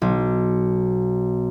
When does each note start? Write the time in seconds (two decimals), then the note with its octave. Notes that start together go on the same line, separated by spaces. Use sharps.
0.02 B1